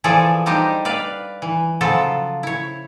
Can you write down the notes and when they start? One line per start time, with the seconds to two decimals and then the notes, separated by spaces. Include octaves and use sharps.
0.04 E3 F3 G#4 A4 D5
0.46 G3 C4 D4 D#4 G4 D#5
0.85 B4 D5 F5
1.42 E3
1.81 C#3 F3 F#3 F4 A4
2.43 E4 C#5